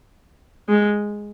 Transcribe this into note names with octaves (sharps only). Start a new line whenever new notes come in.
G#3